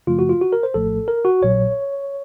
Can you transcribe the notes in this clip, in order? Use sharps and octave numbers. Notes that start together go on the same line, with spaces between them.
F#2 C#3 F3 A3 F4
F#4
F4
F#4
A#4
C5
A#1 A2 F3 A3 A4
A#4
F#4
A#1 A#2 F#3 C#5